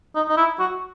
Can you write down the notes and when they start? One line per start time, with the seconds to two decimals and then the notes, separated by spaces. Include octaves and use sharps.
0.15 D#4
0.29 D#4
0.37 E4
0.59 F#4